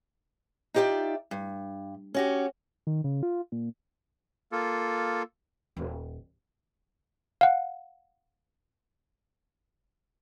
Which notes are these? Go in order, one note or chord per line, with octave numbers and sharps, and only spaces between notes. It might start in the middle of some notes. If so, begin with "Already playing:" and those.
D#4 F4 G4 B4 D5 E5
G2
C#4 F#4 G4
D#3
C#3
F4
A#2
A#3 F4 A4
D#1
F5 F#5